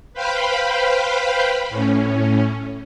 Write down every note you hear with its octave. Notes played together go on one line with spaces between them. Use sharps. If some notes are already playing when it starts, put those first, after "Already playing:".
B4 C5 F5 G5 B5
A2 C#4